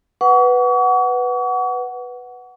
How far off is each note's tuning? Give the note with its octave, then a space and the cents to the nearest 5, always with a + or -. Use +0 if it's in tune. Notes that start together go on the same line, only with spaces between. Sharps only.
B4 +0 F#5 +5 C#6 +40